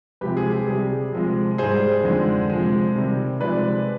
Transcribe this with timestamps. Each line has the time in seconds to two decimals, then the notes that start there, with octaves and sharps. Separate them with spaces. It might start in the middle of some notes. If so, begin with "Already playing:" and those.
0.21 C3 F3 G#3 G4 B4
0.37 G#4
0.51 G4
0.67 C3 G3 G#4
1.12 C3 F3 G#3
1.58 G#2 G3 G#4 C5
2.04 F2 D3 F3 G#3
2.50 C3 F3 G#3
2.96 C3 D#3 G3
3.41 C3 F3 G#3 B4 D5